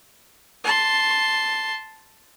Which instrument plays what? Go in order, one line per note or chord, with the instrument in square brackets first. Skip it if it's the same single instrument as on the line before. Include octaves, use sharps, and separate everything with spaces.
[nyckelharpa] A5 C6